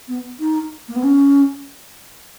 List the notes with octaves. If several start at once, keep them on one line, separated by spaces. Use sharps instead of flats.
B3
D#4
A#3
B3
C#4